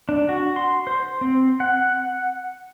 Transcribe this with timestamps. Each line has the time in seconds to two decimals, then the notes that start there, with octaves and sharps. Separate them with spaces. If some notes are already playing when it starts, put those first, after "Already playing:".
0.09 D4
0.29 F#4
0.56 C6
0.87 C5
1.21 C4
1.60 F#5